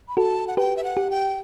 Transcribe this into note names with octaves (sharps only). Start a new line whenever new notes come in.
B5
F#4 A4 A5
F#5
G4 B4 G5
E5
F#5
G4
G5